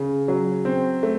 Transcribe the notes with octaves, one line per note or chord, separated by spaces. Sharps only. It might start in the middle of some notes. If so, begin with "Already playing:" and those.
Already playing: C#3
F#3
C4
A3